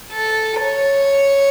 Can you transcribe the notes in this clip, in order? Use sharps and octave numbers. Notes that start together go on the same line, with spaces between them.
A4
C#5